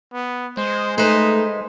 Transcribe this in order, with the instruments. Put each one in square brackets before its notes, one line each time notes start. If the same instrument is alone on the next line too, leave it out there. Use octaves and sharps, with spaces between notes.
[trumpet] B3
[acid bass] G#3 [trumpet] C5
[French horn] A3 [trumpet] D#4 [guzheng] B4 C5